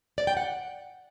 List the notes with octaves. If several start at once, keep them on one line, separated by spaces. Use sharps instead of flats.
D5
G5
F#5